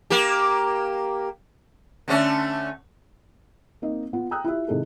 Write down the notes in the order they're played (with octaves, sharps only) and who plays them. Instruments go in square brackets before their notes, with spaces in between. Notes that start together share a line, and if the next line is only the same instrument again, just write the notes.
[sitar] A#3 G4
D3 A3 C#4
[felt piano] A#3 C4 D#4 D#5
B3 F4
G5 A#5 D#6 E6 F#6
E4 F4 G4 E5
C3 D#3 G#3 E4 G#4 A4